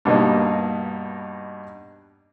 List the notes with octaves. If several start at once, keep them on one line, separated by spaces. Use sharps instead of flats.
G2 B2 A#3 D#4